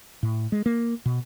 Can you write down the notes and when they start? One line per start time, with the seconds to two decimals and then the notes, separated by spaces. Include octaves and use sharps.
0.23 A2
0.52 G#3
0.66 A#3
1.06 B2